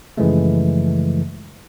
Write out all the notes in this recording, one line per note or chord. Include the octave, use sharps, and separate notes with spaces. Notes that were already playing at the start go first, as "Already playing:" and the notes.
F#2 C#3 E3 F3 G#3 A3